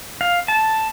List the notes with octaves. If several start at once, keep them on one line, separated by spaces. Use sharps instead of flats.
F5
A5